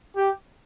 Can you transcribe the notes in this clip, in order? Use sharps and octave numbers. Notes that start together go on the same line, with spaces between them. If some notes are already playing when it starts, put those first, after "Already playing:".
G4